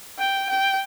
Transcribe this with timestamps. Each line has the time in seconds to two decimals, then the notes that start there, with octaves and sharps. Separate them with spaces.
0.19 G5
0.50 G5